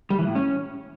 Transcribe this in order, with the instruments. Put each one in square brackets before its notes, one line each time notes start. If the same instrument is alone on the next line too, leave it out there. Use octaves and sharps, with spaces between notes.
[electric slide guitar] G3
E3
A2
C#4